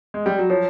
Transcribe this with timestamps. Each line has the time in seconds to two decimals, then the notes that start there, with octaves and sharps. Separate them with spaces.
0.14 G#3
0.26 G3
0.38 F#3
0.50 F3 C#5